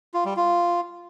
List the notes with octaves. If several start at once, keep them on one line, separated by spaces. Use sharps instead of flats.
F4
G3
F4